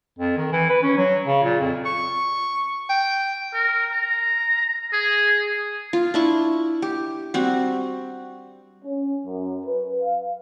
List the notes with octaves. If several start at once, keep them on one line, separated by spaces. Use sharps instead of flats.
F2
D#3
E3
B4
C#4
F#3
C#3
A#2
F2
C#6
G5
A#4
A#5
G#4
F4
D4 E4 C#6
G4
G3 C4 F#4
C#4
F#2
B4
F5